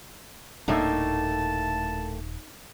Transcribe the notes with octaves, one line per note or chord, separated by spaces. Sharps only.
D#1 A2 A3 A#3 D4 D#4 A5